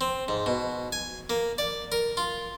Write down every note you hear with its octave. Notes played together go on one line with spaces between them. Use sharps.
C4
G#2
B2
G#5
A#3
D5
A#4
F4